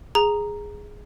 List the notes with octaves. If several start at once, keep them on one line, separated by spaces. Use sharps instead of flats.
G#4 A#5